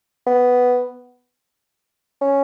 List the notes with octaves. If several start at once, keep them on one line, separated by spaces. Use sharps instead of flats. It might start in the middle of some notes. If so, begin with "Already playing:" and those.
B3
C#4